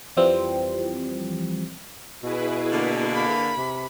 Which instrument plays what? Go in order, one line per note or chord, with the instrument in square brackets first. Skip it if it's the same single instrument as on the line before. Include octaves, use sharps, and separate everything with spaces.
[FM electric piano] F2 E3 F3 G3 C4
[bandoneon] B2 [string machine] E4 G#4 B4
[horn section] D3 A#3
[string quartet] B5
[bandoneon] C3